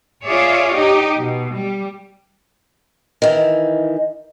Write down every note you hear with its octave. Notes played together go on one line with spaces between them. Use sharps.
F4 G#4 C#5 D5 E5
D#4 G4 D#5
B2
G3
D#3 E3